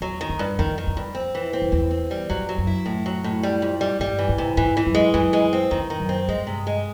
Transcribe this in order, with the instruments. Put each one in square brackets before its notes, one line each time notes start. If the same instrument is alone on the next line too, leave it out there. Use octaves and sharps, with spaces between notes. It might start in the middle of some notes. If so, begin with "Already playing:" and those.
[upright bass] E2 [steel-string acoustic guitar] F#3
[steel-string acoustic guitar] D#3
[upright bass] F2
[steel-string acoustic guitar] G2
[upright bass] F2 [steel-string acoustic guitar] D#3
[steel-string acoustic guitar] D#3
[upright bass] F2
[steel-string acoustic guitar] G2
C4
E3
C4
[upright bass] F2
[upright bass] E2 [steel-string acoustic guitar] C4
[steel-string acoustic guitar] C4
G3
[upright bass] F2 [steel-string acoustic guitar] F#3
[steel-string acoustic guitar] F#3
[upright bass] F#2
[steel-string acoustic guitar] E4
A2
F#3
A2
G3
F2
G3
[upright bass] G2 [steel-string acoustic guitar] G3
[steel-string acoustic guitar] E3
[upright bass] G#2
[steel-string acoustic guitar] C3
[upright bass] G#2 [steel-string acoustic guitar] E3
[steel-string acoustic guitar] E3
[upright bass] F#2
[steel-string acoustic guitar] G#3
[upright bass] F#2 [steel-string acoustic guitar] E3
[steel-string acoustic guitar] G#3
C4
[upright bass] F2 [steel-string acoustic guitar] D#3
[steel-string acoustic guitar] D#3
[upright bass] F#2
[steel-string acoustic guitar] C4
[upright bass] G2 [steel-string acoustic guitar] G#3
[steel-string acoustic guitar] C3
G#3